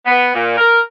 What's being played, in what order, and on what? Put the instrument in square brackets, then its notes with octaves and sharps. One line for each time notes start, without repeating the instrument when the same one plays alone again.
[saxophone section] B3
A#2
A#4